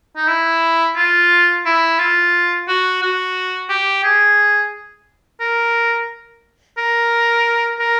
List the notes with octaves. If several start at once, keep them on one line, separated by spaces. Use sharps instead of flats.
D#4
E4
F4
E4
F4
F#4
F#4
G4
G#4
A#4
A#4
A#4